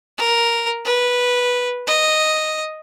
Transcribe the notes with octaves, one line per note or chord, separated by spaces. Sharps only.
A#4
B4
D#5